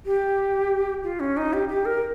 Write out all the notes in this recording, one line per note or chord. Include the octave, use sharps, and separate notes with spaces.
G4
F4
C#4
D#4
G4
G4
A#4